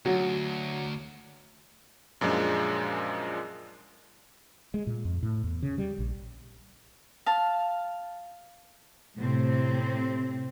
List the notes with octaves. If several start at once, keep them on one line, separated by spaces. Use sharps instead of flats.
D2 F#3
F#2 A#2 F3 G#3 D4
G#3
A#2
F2
A2
E2
C#3
G3
A#1
F5 A5
A2 C3 C4